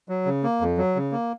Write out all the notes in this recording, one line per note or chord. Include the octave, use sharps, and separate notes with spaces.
F#3
C#3
A#3
F2
F#3
C#3
A#3